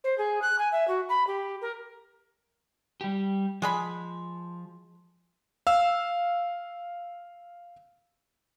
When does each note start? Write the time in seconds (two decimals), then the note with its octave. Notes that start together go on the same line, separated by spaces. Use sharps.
0.03 C5
0.17 G#4
0.41 F#6
0.58 G#5
0.71 E5
0.87 F#4
1.08 B5
1.26 G4
1.61 A#4
3.01 G3 G4
3.62 F3 G#3 G#4 B5
5.67 F5 E6